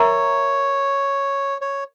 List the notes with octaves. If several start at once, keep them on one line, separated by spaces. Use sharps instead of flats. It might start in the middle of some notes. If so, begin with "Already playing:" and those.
Already playing: A#4 C#5 E5 A#5 C#6
C#5